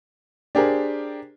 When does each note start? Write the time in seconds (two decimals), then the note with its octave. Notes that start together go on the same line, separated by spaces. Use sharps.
0.55 D4 G4 G#4 A#4 C5